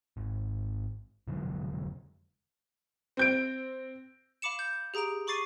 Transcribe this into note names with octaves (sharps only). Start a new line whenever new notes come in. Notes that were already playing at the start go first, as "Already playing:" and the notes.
G#1
F1 D3 F#3 G#3
C4 G6 D7
F5 B5 D6 C#7 E7
G6
G4 G#4 A#5 D7 F7
B5 C#6 D6 A6 C7 D#7